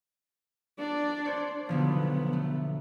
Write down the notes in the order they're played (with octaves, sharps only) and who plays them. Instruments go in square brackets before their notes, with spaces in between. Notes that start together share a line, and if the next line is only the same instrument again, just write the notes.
[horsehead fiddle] D4 D5
[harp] C5 C#5
[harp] B1 D3 F3 [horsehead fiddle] B3
[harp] A3